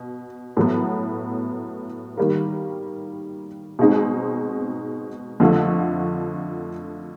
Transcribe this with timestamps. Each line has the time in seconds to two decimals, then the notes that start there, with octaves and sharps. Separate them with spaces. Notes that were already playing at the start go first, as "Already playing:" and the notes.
Already playing: B2
0.57 A2 F#3 B3
2.17 D#3 G3 A#3
3.79 B2 G#3 C4 D#4 G#4
5.40 F2 D3 F3 A3